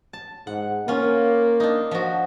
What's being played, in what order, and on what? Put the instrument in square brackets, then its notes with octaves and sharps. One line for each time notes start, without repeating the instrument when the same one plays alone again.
[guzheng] A5
[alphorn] G#2 [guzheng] F#5
[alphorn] A#3 [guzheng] C#4 F4
[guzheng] D4 D#4
F3 F#4